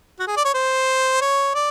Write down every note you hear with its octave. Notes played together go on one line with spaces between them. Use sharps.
F#4
G#4
D5
C#5
C5
C#5
D5